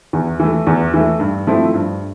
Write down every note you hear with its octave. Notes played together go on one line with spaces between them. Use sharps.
E2
E3 A3
E2
E3 A3
G2
F3 A3 C4 E4
G2